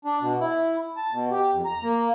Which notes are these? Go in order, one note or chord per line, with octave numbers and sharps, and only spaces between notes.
D4
B2
E4
A5
B2
G4
F2
A#5
A#3